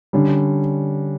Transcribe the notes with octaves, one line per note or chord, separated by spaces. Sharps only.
D3 G3 C#4